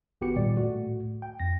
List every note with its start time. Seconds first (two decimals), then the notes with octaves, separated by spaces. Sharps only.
0.21 G#1 B3 F#4 G4 B4 C#7
0.36 A#2 D#3 G3 D5
0.57 A2 A3 F#4
1.22 G5
1.40 F2 A#6